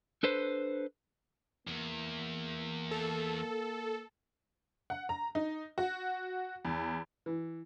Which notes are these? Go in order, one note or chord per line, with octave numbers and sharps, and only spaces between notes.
D4 A4 B4 C5
E2 A#3
A4
F#5
A#5
D#4
F#4
E2
E3